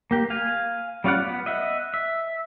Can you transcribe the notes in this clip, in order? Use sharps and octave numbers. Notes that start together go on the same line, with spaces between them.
A#3 G4
F5 G#5
G3 C#4 F4 D5 F#5
B3
D#5 E5 F#5
E5